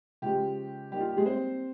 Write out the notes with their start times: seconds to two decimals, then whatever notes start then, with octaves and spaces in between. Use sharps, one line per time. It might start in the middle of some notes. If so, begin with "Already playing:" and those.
0.22 C#3 F3 G#3 G4
0.91 G3 A#3 D#4 G4
1.00 F4
1.09 G4
1.17 G#3 G#4
1.26 C4 C5